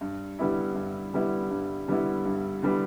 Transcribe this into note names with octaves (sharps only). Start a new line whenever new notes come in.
G2
D3 G3 B3 E4
G2
D3 G3 B3 E4
G2
D3 G3 B3 E4
G2
D3 G3 B3 E4